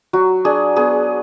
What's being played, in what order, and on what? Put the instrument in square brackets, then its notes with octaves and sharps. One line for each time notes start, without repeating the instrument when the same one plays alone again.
[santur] F#3 F#4
D4 G#4
B3 G#4